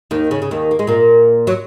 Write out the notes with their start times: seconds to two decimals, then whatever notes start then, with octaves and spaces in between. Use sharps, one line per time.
0.11 D#2 D#3
0.31 C#3
0.42 C#3
0.51 D#2 D#3
0.71 A#3
0.79 G#3
0.87 A#2 A#3
1.47 F#3